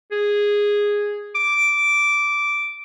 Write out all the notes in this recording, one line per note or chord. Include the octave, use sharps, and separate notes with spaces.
G#4
D6